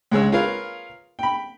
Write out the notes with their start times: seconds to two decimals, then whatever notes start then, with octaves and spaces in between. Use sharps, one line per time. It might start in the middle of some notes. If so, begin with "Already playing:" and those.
0.11 C#2 G#3 G#4 C#5 E6
0.32 F4 G#4 A#4 B4 C#5 F5
1.19 G5 B5